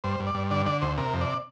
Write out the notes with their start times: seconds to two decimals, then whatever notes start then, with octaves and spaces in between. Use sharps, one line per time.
0.04 G2 C5
0.20 G2
0.27 D5
0.35 G2
0.51 D3 D5
0.66 D3 D5
0.81 D2 C5
0.98 C3 A#4
1.14 F2
1.21 D5